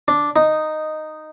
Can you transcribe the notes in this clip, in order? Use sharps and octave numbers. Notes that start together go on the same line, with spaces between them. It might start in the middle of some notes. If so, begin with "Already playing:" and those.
D4
D#4